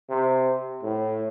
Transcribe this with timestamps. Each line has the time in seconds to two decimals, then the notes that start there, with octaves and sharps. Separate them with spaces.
0.09 C3
0.83 A2